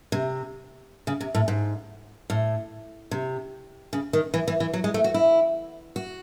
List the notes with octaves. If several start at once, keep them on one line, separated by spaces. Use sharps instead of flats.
C3
C#3
C3
A2
G#2
A2
C3
C#3
D#3
E3
E3
E3
F#3
G#3
A3
F#4
E4
F#4